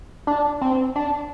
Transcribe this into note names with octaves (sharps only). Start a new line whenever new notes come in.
D4
C4
D4